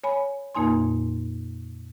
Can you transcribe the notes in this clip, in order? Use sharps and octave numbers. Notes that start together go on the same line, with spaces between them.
C#5 G#5 B5
F2 A#2 A#3 D#4 G#5 C6